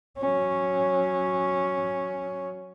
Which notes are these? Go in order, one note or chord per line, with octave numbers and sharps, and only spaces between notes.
F#3 C#4